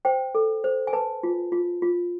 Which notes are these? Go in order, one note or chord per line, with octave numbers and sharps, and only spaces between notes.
C5 G5
A4
C5
G#5
B4 A5
F4
F4
F4